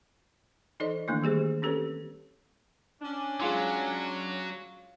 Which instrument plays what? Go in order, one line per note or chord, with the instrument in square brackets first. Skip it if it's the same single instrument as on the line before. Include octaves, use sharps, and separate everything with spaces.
[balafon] E3 D#4 A4 C5 D5 D#5
D#3 E3 A3 A#3 D4 E4
D#3 G3 G4 G#4 C5
C4 C#4 G4 A4 B4 C#5
[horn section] C#4 D4
[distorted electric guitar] F#3 [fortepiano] G#3 F4 C6